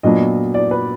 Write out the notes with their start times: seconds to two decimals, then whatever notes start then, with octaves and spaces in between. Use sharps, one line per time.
0.03 A#2 F#3 B3 D4 D#5
0.54 D5
0.71 B4